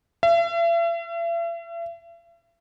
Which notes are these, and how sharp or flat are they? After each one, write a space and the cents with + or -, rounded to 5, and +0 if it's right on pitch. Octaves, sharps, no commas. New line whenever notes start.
E5 +45